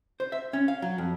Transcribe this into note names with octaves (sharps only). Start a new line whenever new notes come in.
C5
E5
C#4
F5
F#3
F2